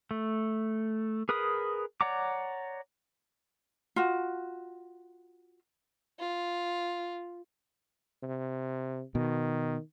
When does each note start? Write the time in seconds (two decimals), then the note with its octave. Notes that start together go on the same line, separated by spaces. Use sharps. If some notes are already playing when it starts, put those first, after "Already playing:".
0.11 A3
1.29 G#4 A#4 B4 B5 D#6
2.01 C#5 D5 F#5 A#5 D6
3.96 F4 F#4
6.19 F4
8.23 C3
9.15 B2 D#3